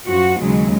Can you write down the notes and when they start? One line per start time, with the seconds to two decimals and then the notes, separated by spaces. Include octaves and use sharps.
0.08 F#2 F3 F#4
0.39 D#2 C#3 F#3 G#3